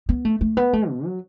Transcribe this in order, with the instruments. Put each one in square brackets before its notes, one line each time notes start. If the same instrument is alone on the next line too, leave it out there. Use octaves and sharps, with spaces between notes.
[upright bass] B3
A3
A3
B3
A3
B2
F#3